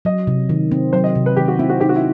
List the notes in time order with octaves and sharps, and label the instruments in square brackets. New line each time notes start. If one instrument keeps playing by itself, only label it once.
[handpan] F#3 [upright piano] D#5
[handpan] C3
D#3
C4
[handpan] F#3 [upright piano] C5
[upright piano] D#5
[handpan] C3
[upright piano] B4
[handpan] D#3 [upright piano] G4
[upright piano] F#4
[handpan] C4 [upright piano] E4
[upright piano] F#4
[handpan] D#4 [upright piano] G4
[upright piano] F#4
E4